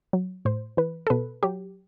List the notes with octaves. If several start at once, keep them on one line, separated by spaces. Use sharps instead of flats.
F#3
A2 C5
E3 B4
A4
B2 B4
F#3 G4